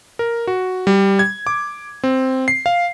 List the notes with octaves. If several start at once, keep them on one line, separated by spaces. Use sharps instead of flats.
A#4
F#4
G3
G#6
D6
C4
C7
F5